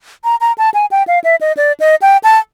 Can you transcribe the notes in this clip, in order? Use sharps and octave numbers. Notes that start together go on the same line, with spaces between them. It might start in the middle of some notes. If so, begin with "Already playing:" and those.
A#5
A#5
A5
G#5
G5
F5
E5
D#5
D5
D#5
G5
A5